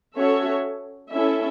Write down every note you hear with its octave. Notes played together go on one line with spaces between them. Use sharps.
C#4 F#4 A4 C#5 E5
C#4 E4 A4 E5